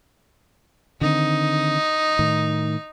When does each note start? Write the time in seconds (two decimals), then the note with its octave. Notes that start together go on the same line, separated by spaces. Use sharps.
1.01 D3 D#3 C4 D#4
2.19 A2 D#3